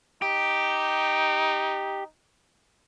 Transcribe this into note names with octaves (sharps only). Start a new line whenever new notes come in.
D#4 G4